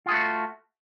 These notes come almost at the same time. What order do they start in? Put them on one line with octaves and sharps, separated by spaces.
F4 G#4 A3 F#4